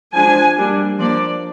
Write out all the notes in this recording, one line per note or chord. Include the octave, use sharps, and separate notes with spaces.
F3 G#3 D4 G#5
G3 A#3 D4
F3 A#3 D4 D5